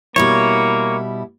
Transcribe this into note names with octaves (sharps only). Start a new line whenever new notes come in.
B2 G3 A#3 E4 C#5